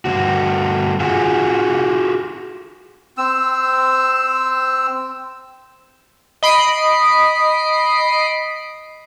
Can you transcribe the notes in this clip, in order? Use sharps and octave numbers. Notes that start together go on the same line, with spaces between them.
G2 D3 F#4
F4 F#4 G#4 F#5 G#5
C4 E6
D#5 B5 C7 D7